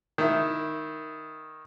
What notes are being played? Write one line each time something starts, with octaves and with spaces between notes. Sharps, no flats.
D#3 E4